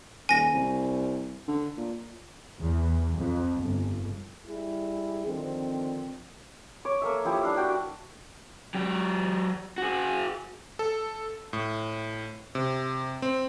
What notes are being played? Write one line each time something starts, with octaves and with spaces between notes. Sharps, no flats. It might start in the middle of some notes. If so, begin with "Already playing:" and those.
D#1 G#5 A#6
C2
D3
A#2
E2
F2
G1
G3 E4 G#4
D3 D#3 F3 C4
C#5 D6
A#3 A4 E5
F3 E4 G4 D#6
D4 E4 F5
F#4 G5
F#3 G4
F#4 G#4
A4
A2
C3
C4